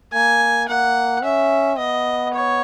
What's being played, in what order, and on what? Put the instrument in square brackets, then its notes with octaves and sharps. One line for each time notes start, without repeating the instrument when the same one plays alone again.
[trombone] A#3 [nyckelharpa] G#5
[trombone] A#3 [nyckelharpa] F#5
[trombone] C#4 [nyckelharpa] E5
[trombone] B3 [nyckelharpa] D#5
[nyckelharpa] C#5